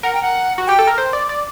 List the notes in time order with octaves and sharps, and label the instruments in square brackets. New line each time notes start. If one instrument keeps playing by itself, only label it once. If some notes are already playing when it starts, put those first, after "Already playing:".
[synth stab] A#4 [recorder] F#5
[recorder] G5
F#5
[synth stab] F#4
[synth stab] G4 [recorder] G5
[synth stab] A4
A#4
C5
D5
D5